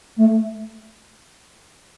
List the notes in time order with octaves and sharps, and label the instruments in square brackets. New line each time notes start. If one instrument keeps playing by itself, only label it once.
[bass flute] A3